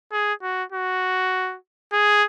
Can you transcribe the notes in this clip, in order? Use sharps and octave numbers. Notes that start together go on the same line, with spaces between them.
G#4
F#4
F#4
G#4